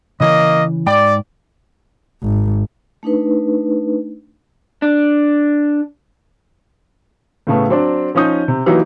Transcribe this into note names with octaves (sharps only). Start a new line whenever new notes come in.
C#3 E3 A#3 D#5
G#2 D5 G5 B5
G#1
A3 D4 D#4 B4
D4
A2 C#3 A3 B3
F#3 C4 D4
F3 C#4 D#4 D#6 G6
C3
E3 F#3 A#3 D#4 F#4 G4